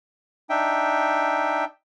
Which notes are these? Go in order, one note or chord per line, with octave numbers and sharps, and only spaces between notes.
D4 D#4 E5 G5